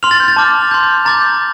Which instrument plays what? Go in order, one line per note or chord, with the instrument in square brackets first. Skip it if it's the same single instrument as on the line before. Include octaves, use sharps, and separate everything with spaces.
[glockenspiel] C6 F6 F7
A6
G6
A6
A5 D6 F6
C6 G6
A#5 D6 G6 A6